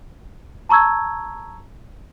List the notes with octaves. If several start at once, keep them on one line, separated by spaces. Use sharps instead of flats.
A5 A#5 C#6 E6 G#6